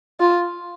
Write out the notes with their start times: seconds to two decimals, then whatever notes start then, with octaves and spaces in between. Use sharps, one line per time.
0.20 F4